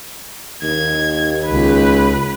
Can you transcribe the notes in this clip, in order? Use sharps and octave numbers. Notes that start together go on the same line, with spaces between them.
D#2 G#6
C#2 B4